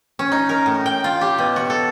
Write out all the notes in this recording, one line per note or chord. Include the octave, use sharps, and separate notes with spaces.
C#4
D#4
A#4
A2
G5
F4
G4
B2
F#4
A4